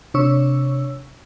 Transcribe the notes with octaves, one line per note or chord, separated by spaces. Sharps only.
C3 D4 C#5 C#6 E6